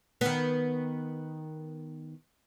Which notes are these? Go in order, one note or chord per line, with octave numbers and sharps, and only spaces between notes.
D#3 B3